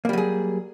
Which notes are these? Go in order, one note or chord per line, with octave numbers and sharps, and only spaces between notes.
F#3 G3 A#3 G#4